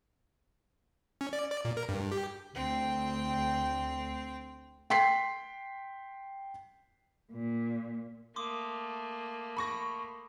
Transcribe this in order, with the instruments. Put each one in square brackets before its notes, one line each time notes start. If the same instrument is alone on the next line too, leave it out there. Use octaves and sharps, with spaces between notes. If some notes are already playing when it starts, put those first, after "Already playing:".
[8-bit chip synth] C#4
D5
D5
A#2
A#4
G2
G4
[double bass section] D2 [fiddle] C4 G5
[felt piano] G5 C6 B6 C7
[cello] A#2
[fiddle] A3 A#3 [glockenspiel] C6 D6 D#6
[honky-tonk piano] B5 C#6 A#6